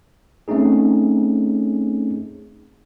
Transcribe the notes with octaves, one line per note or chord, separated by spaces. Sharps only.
A3 C4 C#4 D#4 G#4